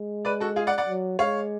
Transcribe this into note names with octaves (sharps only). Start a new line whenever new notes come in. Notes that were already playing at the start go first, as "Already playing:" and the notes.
Already playing: G#3
B4 D5
F#4 A4
F4 G#4
D5 F#5
D5 F#5
F#3
G#3 C#5 F5